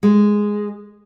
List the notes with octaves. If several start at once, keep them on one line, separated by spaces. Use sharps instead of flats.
G#3